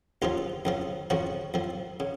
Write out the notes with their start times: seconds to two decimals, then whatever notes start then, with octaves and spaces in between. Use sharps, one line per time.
0.22 D#2 C#3 F3 F4
0.65 F2 C#3 F3
1.10 F2 C#3 F3 F#4
1.54 F2 F3
2.00 C#3